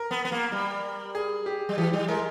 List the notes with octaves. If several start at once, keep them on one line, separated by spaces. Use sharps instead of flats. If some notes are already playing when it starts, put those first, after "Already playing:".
Already playing: A#4
B3
B3
A#3
G3
G#4
G4
G3
E3 G4
G3
G#3 A#4